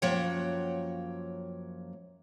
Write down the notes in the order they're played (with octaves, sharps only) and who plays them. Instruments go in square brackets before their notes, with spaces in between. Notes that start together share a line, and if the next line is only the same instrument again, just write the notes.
[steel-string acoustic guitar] F#2 F3 A#3 C#5 F#5 G5